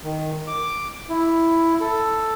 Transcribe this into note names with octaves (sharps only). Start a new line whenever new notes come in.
D#3
D6
E4
A4